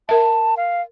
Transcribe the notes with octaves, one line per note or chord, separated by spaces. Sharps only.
A#4 E5 A5
F5